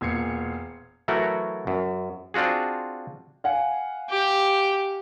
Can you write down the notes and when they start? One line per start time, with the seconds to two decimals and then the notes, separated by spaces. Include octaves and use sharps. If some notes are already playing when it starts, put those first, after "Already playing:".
0.01 E1 A#2 G#6 C7 C#7
1.08 E3 F#3 A3 F#4 A#4
1.67 F#2
2.34 C4 D4 F4 F#4 G#4
3.44 F5 F#5 G#5
4.09 G4